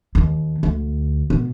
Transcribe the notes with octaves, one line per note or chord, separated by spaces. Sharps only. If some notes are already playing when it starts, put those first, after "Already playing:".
D#2
D2
B2